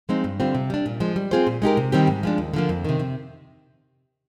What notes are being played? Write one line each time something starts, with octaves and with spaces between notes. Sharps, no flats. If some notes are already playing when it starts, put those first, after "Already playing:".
F3 G#3 C4 D#4
G2
D3 G3 C4 F4
C3
G3 D4
A#2
F3 G#3
G3
C4 F4 G#4 C5
A#2
G#3 D#4 G4 A#4
C3
D#3 G3 C4 G4
G#2
F3 G#3 D4
D#2
D3 F3 A#3
F2
C3 D#3
C3